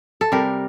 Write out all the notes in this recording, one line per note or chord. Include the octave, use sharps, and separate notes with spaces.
A4
C3 G3 A#4